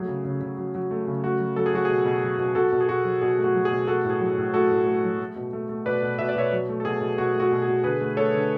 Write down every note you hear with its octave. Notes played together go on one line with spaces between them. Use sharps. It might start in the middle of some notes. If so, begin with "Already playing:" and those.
Already playing: F#3 A3 G#4
C#3
C#3
C#3
F#3
F#3
A3
C#3
A3 F#4
F#3
F#3 A4
G#4
F#3 F#4
B2 G#4
B2
F#3
B2
B2 F#4 A4
B2
G#4
B2 F#4
F#3
B2 G#4
A3
F#4
F#3
G#4
B2
A3 F#4 A4
A2
G#4
F#3
A2
A3 F#4 A4
A2
A3
F#3
A3
B2
A3
A3
B2 B4 D5
B2
B2 E5
D5
B2 C#5 E5
F#3
A3
A4
B2 G#4
B2
B2 F#4
A3
F#4
B2
G#4
B2
D3 G#4 B4
A3
A3 A4 C#5
D3